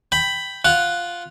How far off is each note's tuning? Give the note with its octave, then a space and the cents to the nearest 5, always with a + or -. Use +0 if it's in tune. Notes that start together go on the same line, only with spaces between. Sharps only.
G5 +0 B5 +10
F4 +0 F#5 +0